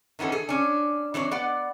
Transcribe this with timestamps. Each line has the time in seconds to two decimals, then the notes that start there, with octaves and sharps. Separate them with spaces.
0.19 D#3 E3 B3 C#4 A4
0.32 G#4 A4
0.49 C#4 D4
1.14 E3 C4 D4 C#5
1.31 B3 D5 F#5